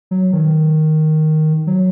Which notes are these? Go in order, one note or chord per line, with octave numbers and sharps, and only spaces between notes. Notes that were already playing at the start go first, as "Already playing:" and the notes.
F#3
D#3
F#3